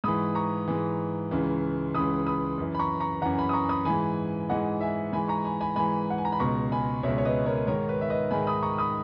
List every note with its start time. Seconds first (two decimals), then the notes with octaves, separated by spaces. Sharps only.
0.04 G#2 E3 B5 D#6
0.35 A#5 C#6
0.68 G#2 E3
1.31 C#2 C#3 E3
1.94 C#2 C#3 E3 B5 D#6
2.26 B5 D#6
2.58 F#2 E3
2.75 B5
2.79 A#5 C#6
3.00 A#5 C#6
3.22 F#2 E3 F#5 A#5
3.38 G#5 B5
3.49 D#6
3.53 A#5 C#6
3.69 B5 D#6
3.85 G#2 E3 G#5 B5
4.49 G#2 E3 D#5 F#5
4.81 E5 G#5
5.13 G#2 E3 G#5 B5
5.28 A#5 C#6
5.44 G#5 B5
5.61 G#5 B5
5.76 G#2 E3 G#5 B5
6.10 F#5
6.18 G#5
6.25 A#5
6.32 B5
6.40 C#2 B2 A#5 C#6
6.72 G#5 B5
7.03 C#2 B2 C#5 E5
7.18 C#5
7.25 B4 D#5
7.46 A#4 C#5
7.67 G#2 D#3 A#4 C#5
7.89 B4
8.01 E5
8.10 B4 D#5
8.31 G#2 D#3 G#5 B5
8.47 B5 D#6
8.63 A#5 C#6
8.78 B5 D#6